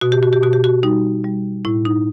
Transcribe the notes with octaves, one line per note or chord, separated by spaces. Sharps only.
B2 F#4
G4
F#4
G4
B2 F#4
G4
F#4
G3 D#4
G3
A2 E4
D#4